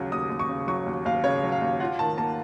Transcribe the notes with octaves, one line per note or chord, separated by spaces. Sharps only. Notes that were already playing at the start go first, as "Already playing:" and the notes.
Already playing: D#2 C#3 F#3
D#2 D#6
D#2
C#6
C#3
F#3 C#6
D#2
D#2 F5
C#3 C#5
F#3
F5
D#2
F4 F#5
D#3 A5
A#3 A5